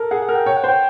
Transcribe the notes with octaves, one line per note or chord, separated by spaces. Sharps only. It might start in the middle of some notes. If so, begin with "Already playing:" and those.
Already playing: A4 A#4
G#4 F#5
F#5
A#4
G5
C#5 G5
F#5
C5 G5